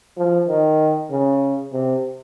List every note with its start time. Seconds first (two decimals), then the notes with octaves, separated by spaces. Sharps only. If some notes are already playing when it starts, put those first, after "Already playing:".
0.18 F3
0.48 D#3
1.11 C#3
1.73 C3